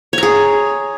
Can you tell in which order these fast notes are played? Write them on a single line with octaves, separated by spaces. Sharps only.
C#5 A#5 G#4